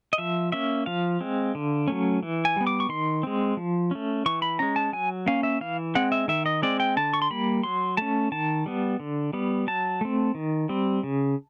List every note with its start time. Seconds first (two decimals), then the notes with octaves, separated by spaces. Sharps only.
0.13 D#5
0.18 F3 E5
0.52 A#3 C#4 E5
0.86 F3 F5
1.21 G#3 C4
1.55 D3
1.88 F#3 A3 C#4
2.23 E3
2.45 G#5
2.56 G3 B3
2.67 D6
2.80 C#6
2.89 D#3 C6
3.23 G#3 C4
3.57 F3
3.91 A3 C#4
4.26 E3 C#6
4.42 B5
4.59 G#3 C#4 A#5
4.76 A5
4.93 F#3 G#5
5.26 A#3 C#4 F5
5.43 E5
5.61 E3 F5
5.95 G#3 C4 F#5
6.12 E5
6.28 D#3 E5
6.46 D#5
6.62 G#3 C4 D5
6.80 G5
6.97 D3 A5
7.13 C#6
7.22 C6
7.30 G3 A#3 B5
7.63 F#3 C6
7.97 A3 C#4 A5
8.32 D#3 A5
8.66 G3 B3
9.00 D3
9.33 G3 B3
9.67 F#3 A5
10.01 A3 C4
10.35 D#3
10.69 G3 C4
11.03 C#3